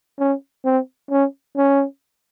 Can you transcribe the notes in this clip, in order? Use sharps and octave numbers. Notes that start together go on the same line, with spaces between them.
C#4
C4
C#4
C#4